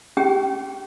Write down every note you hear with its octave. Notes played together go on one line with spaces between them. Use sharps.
C#4 G4 G#4 G5